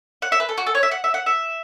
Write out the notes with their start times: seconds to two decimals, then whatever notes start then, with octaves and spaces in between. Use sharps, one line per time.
0.22 F#5
0.32 E5
0.40 B4
0.49 A4
0.58 F#4
0.66 A4
0.75 C#5
0.83 E5
0.91 F#5
1.04 E5
1.14 F#5
1.26 E5